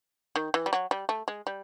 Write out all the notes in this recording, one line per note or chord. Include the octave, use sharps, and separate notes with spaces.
D#3
E3
G3
F#3
G3
A3
G#3
G3